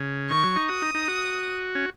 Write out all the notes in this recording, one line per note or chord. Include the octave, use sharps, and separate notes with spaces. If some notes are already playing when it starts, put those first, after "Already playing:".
Already playing: C#3
D#3 C#6
F#3
D#4
F#4 D#6
D#4
D#4
F#4
C#4